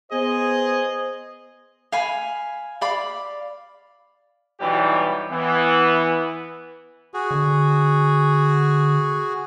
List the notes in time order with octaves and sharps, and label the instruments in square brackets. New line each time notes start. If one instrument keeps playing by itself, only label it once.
[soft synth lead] B3 [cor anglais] G#4 [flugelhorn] C5 [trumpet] D#5
[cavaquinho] F5 G#5 B5
D5 F5 B5 D6
[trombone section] B2 E3 F#3 G3 D#4 G4
E3 B3
[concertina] F#4 G#4
[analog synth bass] D3